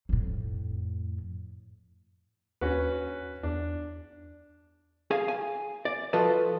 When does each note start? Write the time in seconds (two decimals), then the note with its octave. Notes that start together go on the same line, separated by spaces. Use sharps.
0.09 F2 A2
2.61 D#2 C#4 F#4 B4
3.43 E2 D4
5.11 G#4 F5 G#5
5.28 G#5
5.85 D5
6.13 F3 F4 F#4 A4 B4 D#5